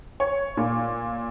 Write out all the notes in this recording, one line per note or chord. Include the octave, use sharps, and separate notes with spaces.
C#5
A#2